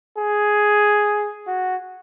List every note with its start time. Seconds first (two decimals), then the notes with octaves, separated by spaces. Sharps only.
0.17 G#4
1.47 F#4